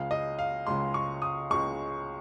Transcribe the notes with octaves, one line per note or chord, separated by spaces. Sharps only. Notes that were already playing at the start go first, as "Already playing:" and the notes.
Already playing: C#2 C#3 G#3 F5
D#5
F5
C#2 C#3 G#3 C6
C#6
D#6
C#2 C#3 G#3 C#6